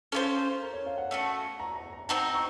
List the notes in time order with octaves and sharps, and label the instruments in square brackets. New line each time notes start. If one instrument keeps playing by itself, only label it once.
[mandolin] C#4 F4 C5 [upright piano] A4
[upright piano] A#4
C#5
F5
F#5
[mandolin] A3 C#4 F#4
[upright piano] A#5
A#5
A#5
[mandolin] C4 D#4 F#4 [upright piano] A5
[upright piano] A#5
C#6